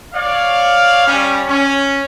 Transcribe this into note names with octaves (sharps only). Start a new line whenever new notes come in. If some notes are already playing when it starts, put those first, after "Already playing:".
C#5 D5 F5
G3 C#4
C#4